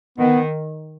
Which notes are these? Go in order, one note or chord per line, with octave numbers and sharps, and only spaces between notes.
D#3 B3